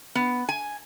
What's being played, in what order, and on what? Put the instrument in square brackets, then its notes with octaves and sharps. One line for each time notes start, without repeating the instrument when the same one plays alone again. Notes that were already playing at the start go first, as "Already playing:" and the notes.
[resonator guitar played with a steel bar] B3
G#5